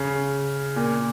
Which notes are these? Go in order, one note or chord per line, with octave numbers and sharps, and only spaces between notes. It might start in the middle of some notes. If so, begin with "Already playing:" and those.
Already playing: C#3
A#2